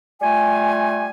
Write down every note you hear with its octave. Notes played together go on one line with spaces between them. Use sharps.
G3 A3 F4 G#5